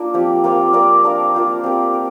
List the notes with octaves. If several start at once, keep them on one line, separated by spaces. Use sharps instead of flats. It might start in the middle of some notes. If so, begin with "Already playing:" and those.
Already playing: A#3 D4 F4 A#4
F3 C4 G4
A#3 F4 C5 F5
C4 A#4 D5 F5
D4 A#4 F5
A#3 F4 C5
C4 G4 A#4
A#4